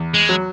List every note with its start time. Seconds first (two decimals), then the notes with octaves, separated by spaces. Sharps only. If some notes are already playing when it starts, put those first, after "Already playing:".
Already playing: E2
0.14 G#3
0.29 F#3